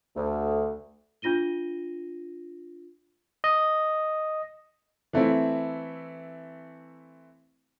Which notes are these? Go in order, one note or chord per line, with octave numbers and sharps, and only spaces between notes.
D2 A3
D4 F4 A#6 D#7 G7
D#5
E3 A3 C4 E4